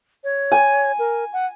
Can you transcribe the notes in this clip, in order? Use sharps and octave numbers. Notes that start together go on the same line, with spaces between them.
C#5
G#5
A#4
F#5